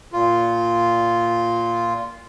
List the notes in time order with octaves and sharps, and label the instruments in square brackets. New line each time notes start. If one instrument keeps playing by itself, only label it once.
[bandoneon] A#2 F4